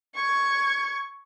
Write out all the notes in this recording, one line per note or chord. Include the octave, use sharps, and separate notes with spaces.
C#6 G#6